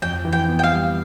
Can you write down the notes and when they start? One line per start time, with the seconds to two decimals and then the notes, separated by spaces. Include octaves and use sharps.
0.02 F2 G5
0.25 E3
0.32 G5
0.48 B3
0.59 G5
0.63 F5
0.72 G3